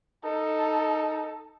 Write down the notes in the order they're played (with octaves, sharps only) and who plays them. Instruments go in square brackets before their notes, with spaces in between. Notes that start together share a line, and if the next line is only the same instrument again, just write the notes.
[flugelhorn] D#4 [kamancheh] A4